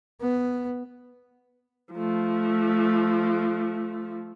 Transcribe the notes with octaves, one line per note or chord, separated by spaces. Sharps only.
B3
F3 A3